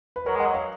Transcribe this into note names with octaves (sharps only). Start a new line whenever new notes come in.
B4
F#3 A#4 C#5
G#3 D#5 F#5
F#3
C#5 F5